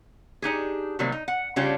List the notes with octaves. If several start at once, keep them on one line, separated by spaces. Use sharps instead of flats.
D4 D#4 G4 G#4
C3 D#3 F#3 G3 A#3 C4
D#4
F#5
C#3 G3 C#4 D4 F4 G4